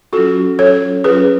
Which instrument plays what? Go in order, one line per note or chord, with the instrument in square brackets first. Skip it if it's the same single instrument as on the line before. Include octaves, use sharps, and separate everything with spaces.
[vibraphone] F#3 C#4 F4 [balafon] F#4 A4
[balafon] A4 C#5
[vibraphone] F#3 C#4 F4 [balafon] G#4 B4